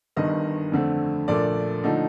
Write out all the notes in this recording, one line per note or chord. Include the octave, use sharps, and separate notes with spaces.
G1 G2 D#3 D#5
F2 D3 A3 C4
A#1 A#2 A3 D5
D3 F3 A3 D#4